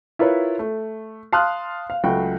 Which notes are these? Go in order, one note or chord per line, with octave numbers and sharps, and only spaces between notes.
E4 F4 A#4 B4 C#5
A3
F5 A5 C6 D#6 F6 F#6
F5
C#2 F#3 A3 F#4 G5